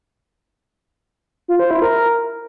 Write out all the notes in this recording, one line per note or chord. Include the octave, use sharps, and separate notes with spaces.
F4
C5
E4
A#4